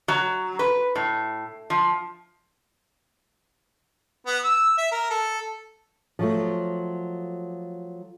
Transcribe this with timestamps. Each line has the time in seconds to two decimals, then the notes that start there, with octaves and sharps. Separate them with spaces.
0.08 F#3
0.59 B4
0.95 A2
1.70 F3
4.26 B3
4.44 E6
4.78 E5
4.91 A#4
5.10 A4
6.19 F3 F#3 A3